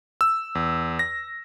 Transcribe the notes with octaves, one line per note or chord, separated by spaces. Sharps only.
E6
E2
A#6